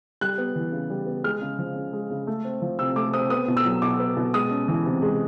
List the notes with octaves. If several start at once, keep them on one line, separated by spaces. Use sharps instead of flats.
G3 F#6
B3
E3
C#3
G3
B3
G#3 F6
C#3
F3
C#3
G#3
C#3
A3
C4
F3
C3 E6
A3 D6
C4 D#6
B3 D#6
B2
E6
F#3
B2 D6
B3
B2
G#3 D#6
C#4
E3
C3
G#3